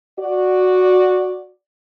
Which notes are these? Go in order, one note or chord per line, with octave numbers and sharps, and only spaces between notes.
F#4 D5